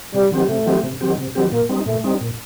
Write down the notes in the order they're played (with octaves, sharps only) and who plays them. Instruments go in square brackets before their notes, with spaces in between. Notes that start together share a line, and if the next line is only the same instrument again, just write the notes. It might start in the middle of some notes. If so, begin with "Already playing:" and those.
[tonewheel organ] C3 [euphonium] G3
[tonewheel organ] D#3 F#3 C4 G4
[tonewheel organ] C3 [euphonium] A3
[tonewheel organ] D#3 F#3 C4 G4
C3
D#3 F#3 C4 G4
C3
D#3 F#3 C4 G4
[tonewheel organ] A#2 [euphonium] A#3
[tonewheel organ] G3 C4 D#4
[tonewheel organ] A#2 [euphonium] A3
[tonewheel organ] G3 C4 D#4
A#2